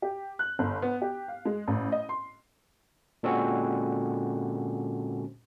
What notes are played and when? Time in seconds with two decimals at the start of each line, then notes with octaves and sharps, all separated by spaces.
0.02 G4
0.39 F#6
0.59 G1
0.82 B3
1.02 G4
1.28 F5
1.45 G#3
1.68 A1
1.92 D#5
2.09 C6
3.23 A#2 D3 G#3 C4 C#4 F#4